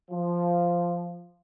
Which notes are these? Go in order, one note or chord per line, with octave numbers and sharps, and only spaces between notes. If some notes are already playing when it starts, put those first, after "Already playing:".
F3